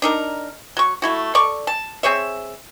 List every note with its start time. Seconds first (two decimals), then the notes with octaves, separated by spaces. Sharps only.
0.02 D4 D#4 A#4
0.77 F#3 C#6
1.02 A3 E4 F#4
1.35 A4 D5 C#6
1.67 A5
2.03 C4 G#4 C#5 E5